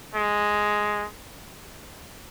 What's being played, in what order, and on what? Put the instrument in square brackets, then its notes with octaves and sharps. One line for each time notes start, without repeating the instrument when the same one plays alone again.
[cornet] G#3